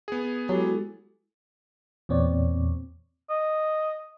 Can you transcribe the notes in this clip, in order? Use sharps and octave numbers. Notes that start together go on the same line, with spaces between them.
B3 G#4
F#3 G#3 E4 G4 A4
E2 A#2 C4 C#5 D5
D#5